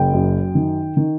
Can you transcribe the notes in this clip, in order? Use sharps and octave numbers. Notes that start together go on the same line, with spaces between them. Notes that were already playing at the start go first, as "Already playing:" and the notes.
Already playing: F#1 G5
F#2
D#3
D#3